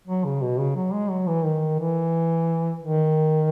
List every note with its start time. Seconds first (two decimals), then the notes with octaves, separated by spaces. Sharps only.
0.07 F#3
0.25 C#3
0.42 B2
0.59 C#3
0.76 F#3
0.93 G#3
1.10 F#3
1.27 E3
1.45 D#3
1.79 E3
2.82 D#3